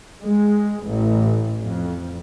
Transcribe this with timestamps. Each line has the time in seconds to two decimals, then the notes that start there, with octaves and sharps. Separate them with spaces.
0.23 G#3
0.85 A1
1.64 F2